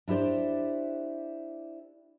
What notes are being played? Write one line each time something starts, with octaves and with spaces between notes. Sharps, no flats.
D4 E4 G4 C5 D5